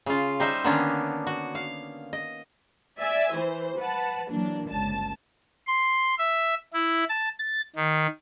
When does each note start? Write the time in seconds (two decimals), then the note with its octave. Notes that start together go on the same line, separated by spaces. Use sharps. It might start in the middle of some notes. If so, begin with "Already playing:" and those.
0.06 C#3 F4
0.40 G3 D#4 C5 E5
0.64 D3 D#3 A#3 B3 C#4 D4
1.27 F#4
1.55 F5
2.13 D#5
3.00 D5 E5 G#5
3.31 E3 C5
3.78 B4 F#5 A5
4.29 E3 F#3 A#3 D4
4.69 G1 C#2 A5
5.67 C6
6.19 E5
6.73 E4
7.09 A5
7.39 A6
7.76 D#3